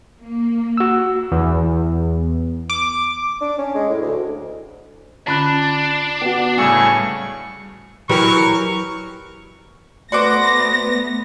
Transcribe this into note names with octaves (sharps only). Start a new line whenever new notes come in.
A#3
F#4 E6
E2
D6
D4
C#4
G#3
A2
D2
D3 C#4 D4 F4 A5 B5 F#6
B3 F#4 G5
A2 C#3 G3 D5 G#5 C#6 E6
E3 F#3 G4 A#4 C#6
A3 B3 F#4 B4 C5 D5 D6 A#6